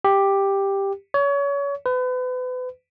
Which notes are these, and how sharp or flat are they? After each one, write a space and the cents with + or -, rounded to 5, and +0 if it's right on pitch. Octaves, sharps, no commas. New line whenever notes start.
G4 +5
C#5 +30
B4 +35